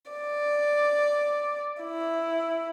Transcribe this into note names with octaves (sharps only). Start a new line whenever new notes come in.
D5
E4